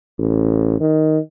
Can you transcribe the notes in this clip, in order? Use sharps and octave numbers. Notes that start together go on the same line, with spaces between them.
A1
D#3